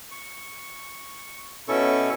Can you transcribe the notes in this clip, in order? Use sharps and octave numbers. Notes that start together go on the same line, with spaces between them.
C#6
B2 C#4 E4 A4 C#6